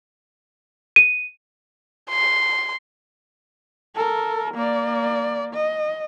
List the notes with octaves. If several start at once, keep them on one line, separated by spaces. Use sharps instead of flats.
D#7
C6
A4 A#4
A#3 D5
D#5